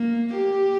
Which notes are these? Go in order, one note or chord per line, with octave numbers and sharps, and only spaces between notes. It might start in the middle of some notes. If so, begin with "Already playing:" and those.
Already playing: A#3
G4